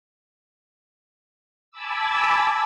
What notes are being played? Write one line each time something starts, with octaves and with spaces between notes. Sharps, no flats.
G#5 A5 B5 D6 E6